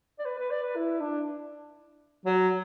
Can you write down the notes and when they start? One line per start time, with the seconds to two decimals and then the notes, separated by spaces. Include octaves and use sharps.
0.19 D5
0.25 B4
0.38 B4
0.50 D5
0.63 B4
0.75 E4
1.00 D4
2.25 F#3